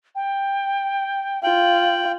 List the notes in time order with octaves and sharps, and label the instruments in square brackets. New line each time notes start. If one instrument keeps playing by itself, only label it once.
[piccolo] G5
[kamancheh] F4 [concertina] G5 [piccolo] F#7